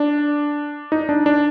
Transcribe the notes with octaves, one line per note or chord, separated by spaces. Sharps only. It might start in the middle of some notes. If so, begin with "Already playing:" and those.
Already playing: D4
D#4
D4
D4